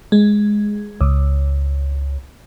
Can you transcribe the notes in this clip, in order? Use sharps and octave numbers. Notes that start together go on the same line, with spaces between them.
G#3
C#2